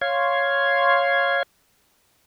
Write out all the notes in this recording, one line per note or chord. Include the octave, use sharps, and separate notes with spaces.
C#5 F5 C6 G#6